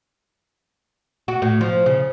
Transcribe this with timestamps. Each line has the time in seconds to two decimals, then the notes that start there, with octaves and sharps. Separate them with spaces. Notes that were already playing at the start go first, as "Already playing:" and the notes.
1.28 F#4
1.42 A2
1.61 F3
1.86 C#3